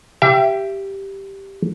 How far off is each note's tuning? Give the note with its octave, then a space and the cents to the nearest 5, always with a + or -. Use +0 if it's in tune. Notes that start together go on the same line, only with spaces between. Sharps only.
G4 -5 E5 +35